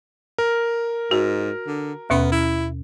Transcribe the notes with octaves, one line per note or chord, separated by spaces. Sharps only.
A#4
G#2 F#4
D3
D#2 B2 B3 C#4
E4